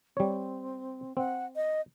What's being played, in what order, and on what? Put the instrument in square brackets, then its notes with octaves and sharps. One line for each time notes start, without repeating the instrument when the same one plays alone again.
[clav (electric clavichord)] G3 C#5 [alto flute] C4
[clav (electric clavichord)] C4 [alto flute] F#5
[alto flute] D#5